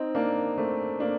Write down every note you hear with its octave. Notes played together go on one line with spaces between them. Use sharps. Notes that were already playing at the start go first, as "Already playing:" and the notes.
Already playing: C4 D#4
A#3 D4
A3 C4
A#3 D4